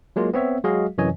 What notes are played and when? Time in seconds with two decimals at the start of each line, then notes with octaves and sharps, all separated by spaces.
0.16 F#3 G#3 A#3 F4
0.34 B3 C4 C#5 E5
0.64 F#3 G#3 F#4 G#4 D#5 F5
0.98 F#2 C3 E3 C#5 D#5 G#5